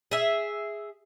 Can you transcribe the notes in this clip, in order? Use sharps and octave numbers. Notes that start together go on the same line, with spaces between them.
G#4 E5